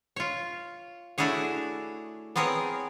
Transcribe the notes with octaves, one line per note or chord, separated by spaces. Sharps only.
F4 C#5
A3 D4 E4 F#4 G#4 C#5
B3 C4 G#4 A#4 C#5